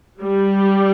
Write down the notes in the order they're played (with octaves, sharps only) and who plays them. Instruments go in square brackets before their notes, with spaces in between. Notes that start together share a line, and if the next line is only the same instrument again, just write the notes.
[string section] G3